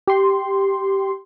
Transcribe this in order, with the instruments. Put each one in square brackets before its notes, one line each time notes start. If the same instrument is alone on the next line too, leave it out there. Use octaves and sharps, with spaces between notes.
[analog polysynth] G4 C6